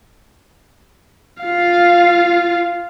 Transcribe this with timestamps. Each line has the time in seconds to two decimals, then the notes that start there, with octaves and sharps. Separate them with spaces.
1.43 F4 F5